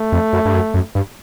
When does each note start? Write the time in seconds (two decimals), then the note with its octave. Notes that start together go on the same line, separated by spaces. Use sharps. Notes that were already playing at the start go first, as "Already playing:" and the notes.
Already playing: A3
0.12 F2
0.33 F#2
0.45 G2
0.54 F#2
0.74 F#2
0.95 G2